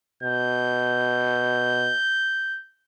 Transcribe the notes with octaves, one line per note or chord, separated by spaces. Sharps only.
B2 G6